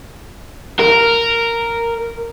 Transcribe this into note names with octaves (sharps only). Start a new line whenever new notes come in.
A#4